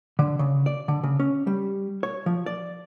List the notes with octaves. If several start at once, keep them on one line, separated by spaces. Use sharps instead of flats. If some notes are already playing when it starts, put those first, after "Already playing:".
D3
C#3
D5
D3
C#3
C#4
G3
C#5
F3
D5